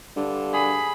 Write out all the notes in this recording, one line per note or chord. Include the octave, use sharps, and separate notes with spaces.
G2 D3
G#4 B5